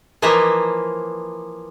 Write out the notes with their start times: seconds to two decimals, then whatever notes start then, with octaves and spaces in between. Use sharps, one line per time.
0.22 E3 F3 A#3 D#5 E5 A#5